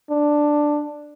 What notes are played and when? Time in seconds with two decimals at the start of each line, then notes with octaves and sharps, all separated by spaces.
0.10 D4